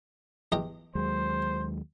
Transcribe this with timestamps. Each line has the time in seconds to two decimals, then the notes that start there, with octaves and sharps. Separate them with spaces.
0.52 E2 G4 D#5
0.95 D#2 F#3 G#3 C5